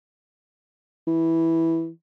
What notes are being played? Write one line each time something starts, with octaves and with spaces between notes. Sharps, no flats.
E3